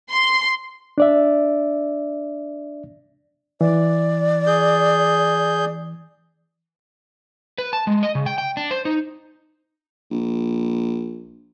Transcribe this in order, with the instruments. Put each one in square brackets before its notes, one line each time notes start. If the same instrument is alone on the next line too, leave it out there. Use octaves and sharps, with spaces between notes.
[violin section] C6
[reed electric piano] D4 D5 E5
[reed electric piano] E3 [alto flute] D5
[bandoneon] G#4 G6
[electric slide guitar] B4
A5
G#3
D#5
C#3
G5
G5
D4
C5
D#4
[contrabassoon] A#1